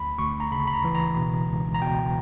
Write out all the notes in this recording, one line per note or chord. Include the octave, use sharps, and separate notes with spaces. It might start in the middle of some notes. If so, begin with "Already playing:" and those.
Already playing: D2 B5
D2 C#6
A#5
C#3 B5
B5
A#5
E3
A#5
B2
C#2
A#5
B2 G5